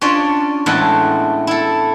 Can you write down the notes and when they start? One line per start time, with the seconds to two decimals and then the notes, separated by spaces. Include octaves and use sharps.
0.01 C#4 D4 F4 C#5 D5
0.66 E2 A2 G#3 A3 A4 F#5
1.47 E4 A4